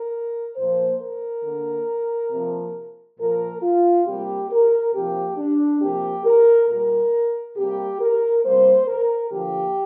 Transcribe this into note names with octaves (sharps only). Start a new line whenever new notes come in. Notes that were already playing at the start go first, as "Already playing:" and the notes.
Already playing: A#4
A#2 F3 A#3 C5
A#4
D3 A#3
C3 F3 A#3
A#2 F3 A#3 A#4
F4
C3 G3 A#3 G4
A#4
C3 F3 A#3 G4
D4
C3 F3 A#3 G4
A#4
A#2 G3 A#3 A#4
C3 G3 A#3 G4
A#4
C3 G3 A#3 C5
A#4
D3 F3 A#3 G4